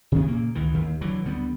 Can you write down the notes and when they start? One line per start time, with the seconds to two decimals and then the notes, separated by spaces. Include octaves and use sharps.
0.12 C3 D#3 E3 B3
0.28 A#2 C#3 A#3
0.55 C#2 D#3 E3
0.74 D#2
1.01 D3 E3 F#3
1.25 D2 D3 G3 B3